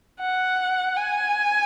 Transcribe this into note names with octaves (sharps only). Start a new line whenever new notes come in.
F#5
G#5